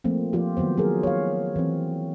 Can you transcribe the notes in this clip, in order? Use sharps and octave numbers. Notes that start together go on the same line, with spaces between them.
F3 A3 A#3 C4
F3 F4 G4
D#3 F#3 B3 C5
F#3 G#4 A#4
C#5 F5
E3 C4